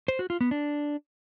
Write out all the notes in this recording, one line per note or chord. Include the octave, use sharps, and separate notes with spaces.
C5
F#4
F4
B3
D4